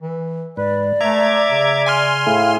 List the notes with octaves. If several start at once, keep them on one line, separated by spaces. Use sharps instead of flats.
E3
G#2 B4 D5
A3 E5 A#5 D6 G#6
C#3
G#5 C6 F6
A2 A3 E4 G#4 F5